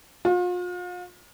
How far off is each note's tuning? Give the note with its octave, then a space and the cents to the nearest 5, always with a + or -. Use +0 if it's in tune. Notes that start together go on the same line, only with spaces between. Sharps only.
F4 +40